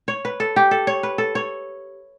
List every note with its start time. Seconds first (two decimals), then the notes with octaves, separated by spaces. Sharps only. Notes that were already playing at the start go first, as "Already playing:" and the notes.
0.08 C#5
0.25 B4
0.40 A4
0.56 G4
0.71 A4
0.87 C#5
1.03 B4
1.18 A4
1.35 C#5